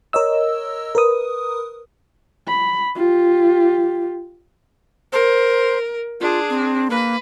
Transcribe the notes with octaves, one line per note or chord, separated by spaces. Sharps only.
A#4 C#5 D#5 E6
A#4 B4 D#6
B5
F4 G4
A#4 C5
D4 F4 G#4
C4
A#3 B4